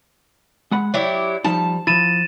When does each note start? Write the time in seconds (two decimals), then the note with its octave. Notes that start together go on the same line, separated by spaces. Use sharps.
0.71 G#3 F#5 B5
0.94 F#3 E4 G4 D5
1.44 F3 G3 D#4 A5
1.87 F3 E4 A6 D#7 E7